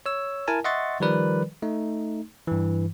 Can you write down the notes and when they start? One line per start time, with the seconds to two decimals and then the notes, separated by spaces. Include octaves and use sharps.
0.06 C#5 E6
0.48 E4 A#4 G#5 A5
0.64 D#5 E5 F#5 C6 C#6 A6
1.00 D#3 F3 G3 A#4 B4 D5
1.62 A3 D#4
2.47 G2 E3